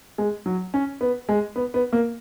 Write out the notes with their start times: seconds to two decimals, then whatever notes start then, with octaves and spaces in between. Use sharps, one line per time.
0.18 G#3
0.46 F#3
0.74 C#4
1.01 B3
1.29 G#3
1.56 B3
1.74 B3
1.93 A#3